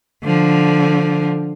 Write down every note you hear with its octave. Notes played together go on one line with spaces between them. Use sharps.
D3 F3